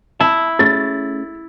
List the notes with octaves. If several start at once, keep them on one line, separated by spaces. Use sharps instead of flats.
E4 A5
A3 C#4 G#4 A6